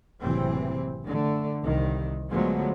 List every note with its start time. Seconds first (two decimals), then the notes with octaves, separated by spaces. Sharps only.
0.21 F#1 A2 C3 E3 C4
1.07 D3 A3
1.65 C2 C3 D#3
2.30 D3 F3 F#3 G#3 A3 B3